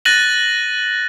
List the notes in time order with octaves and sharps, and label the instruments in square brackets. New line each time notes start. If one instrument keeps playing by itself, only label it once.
[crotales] F#6 A6 A#6 D#7 F#7